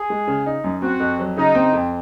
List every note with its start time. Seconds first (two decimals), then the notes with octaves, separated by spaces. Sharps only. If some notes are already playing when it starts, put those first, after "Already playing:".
Already playing: G#4
0.10 G#3
0.28 C#3
0.46 D#4
0.64 F#2
0.82 C4 F#4
1.00 F2
1.19 F#3
1.37 C#3 D#4
1.55 C4
1.73 F2